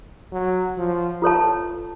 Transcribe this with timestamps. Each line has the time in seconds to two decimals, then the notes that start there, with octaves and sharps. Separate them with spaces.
0.32 F#3
0.77 F3
1.22 F4 A4 C#5 A5